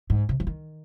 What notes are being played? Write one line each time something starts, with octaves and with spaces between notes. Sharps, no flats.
G#2
C3
F3
D#3